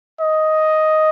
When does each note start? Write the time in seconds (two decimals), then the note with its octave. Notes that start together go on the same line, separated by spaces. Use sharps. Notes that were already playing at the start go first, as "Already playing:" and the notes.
0.21 D#5